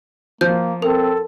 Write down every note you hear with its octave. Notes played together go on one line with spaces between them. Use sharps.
F3 A#3 G6
C4 A4 A#4